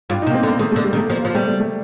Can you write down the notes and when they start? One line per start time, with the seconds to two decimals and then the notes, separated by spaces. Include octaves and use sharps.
0.10 G2 F4
0.22 C3 D#4
0.30 A#3
0.34 C4
0.43 D3
0.48 A#3
0.59 D#3 A3
0.72 D3 A3
0.84 G3
0.93 D#3
0.97 A3
1.10 F3 A#3
1.22 F3 A#3
1.34 G3 A3
1.47 A3
1.60 A3